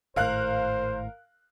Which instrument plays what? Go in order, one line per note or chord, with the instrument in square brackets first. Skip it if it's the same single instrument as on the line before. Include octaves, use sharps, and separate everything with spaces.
[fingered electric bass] G#1 A2 [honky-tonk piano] A#4 F5 F#6 [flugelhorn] C5